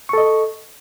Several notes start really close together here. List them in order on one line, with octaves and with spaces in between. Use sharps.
C#6 A4 D#5